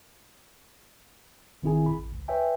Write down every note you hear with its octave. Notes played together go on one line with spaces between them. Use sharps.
G#1 D#3 C4 E4 G#4 G#5
B5
A1
C#2
B4 C#5 E5 G5 G#5